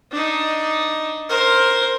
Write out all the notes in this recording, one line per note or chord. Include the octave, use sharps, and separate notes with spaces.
D4 D#4
A#4 C5